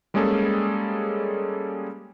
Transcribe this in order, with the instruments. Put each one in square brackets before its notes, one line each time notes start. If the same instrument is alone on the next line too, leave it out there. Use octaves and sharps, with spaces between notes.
[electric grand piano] G3 G#3 A#3 C#4 G#4 A4